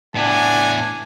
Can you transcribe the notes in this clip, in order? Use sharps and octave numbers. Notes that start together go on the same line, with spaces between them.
A2 B3 D4 G#5